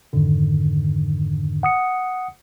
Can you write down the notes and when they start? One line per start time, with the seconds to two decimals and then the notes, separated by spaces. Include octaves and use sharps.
0.13 F2 G#2 D3 D#3
1.63 F#5 D#6 C#7